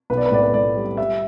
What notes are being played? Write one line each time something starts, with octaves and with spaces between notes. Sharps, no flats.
B1 B4
D5
B4
A2 D5
B4
A2 D5
G3
G3 E5